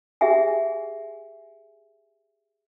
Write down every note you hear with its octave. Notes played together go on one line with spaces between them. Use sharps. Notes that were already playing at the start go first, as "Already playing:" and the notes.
G4 G#4 E5 F#5 G#5